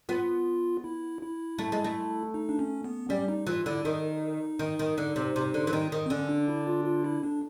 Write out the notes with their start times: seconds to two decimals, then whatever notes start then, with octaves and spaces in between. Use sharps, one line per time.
0.09 B3 F4
0.84 E4
1.21 E4
1.58 A3
1.72 G#3
1.84 A3
2.34 D#4
2.49 D4
2.59 C#4
2.84 B3
3.09 G3 C#4
3.28 D#4
3.47 E3 F4
3.66 D3 E4
3.85 D#3 D#4
4.59 D#3
4.79 D#3
4.98 D3
5.16 C3
5.36 C3
5.54 D3
5.67 E3
5.73 D#3
5.92 D#3
6.06 C4
6.10 D3 C#4
6.29 D4
6.48 E4
6.67 F4
6.85 F4
7.04 E4
7.23 D4